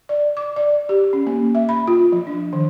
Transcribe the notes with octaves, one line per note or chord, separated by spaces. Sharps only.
D5
D6
D5
G4
C#4
A#3
E5
B5
F4
F3
D4
D#3